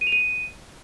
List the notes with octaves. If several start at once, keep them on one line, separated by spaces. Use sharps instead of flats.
D#7
F7
D#7